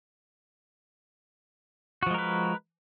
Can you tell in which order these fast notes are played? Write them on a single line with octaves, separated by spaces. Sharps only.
F#4 F3 G#3 A#4 B4